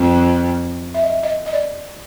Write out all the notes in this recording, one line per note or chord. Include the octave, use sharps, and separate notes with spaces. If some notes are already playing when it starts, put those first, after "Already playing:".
Already playing: F2
E5
D#5
E5
D#5
D#5
D5